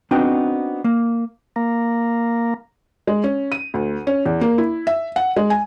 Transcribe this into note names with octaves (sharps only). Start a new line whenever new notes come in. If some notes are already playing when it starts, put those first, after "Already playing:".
B3 C4 D4 D#4 F#4 G5
A#3
A#3
G#3
C#4
D#7
D2
C#4
E2
A#3
E4
E5
F#5
G#3
G#5